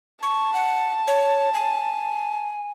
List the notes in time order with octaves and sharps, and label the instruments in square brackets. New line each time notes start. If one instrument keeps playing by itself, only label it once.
[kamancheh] A5 [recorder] C#6
[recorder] F#5
C#5
G#5